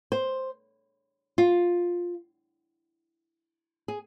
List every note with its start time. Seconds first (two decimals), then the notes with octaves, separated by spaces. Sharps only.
0.12 C5
1.38 F4
3.88 G#4